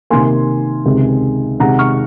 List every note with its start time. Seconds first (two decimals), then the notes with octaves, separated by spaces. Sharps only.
0.10 C3 D#3 A#3 G#5 C6
0.85 C#2 C3 D#3 G#3 C4
1.60 C3 D#3 G#3 C4 F#5 A#5
1.79 C#6 F6